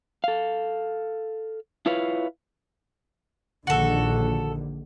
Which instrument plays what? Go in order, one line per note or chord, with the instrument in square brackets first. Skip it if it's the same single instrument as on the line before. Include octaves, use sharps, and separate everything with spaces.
[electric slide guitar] A4 F5
E4 F4 B4 C#5 F5
[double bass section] A#1 D3 D#3 [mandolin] F#4 A4